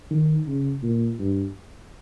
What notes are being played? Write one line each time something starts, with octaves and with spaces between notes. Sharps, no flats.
D#3
C#3
A#2
G2